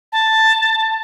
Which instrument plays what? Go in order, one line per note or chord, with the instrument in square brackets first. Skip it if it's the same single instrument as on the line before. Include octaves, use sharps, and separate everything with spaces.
[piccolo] A5